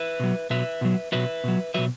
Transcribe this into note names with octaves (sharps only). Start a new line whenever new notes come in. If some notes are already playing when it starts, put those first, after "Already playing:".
Already playing: B4 E5
B2 F#3
B2 F#3 B4 E5
B2 F#3
B2 F#3 B4 E5
B2 F#3
B2 F#3 B4 E5